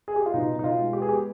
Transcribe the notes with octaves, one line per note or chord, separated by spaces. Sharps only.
G#4
G4
F4
B2 D#4
B2 D#4
F4
G#3
G4
B3 G#4
G4